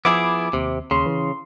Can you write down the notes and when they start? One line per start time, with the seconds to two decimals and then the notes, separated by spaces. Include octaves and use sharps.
0.05 F3 B3 E4 G#4 D6
0.53 D#2 C3
0.91 D#2 C#3 C6
1.06 E3